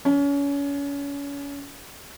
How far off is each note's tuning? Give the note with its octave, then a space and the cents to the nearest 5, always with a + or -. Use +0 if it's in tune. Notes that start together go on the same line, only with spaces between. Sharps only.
C#4 +30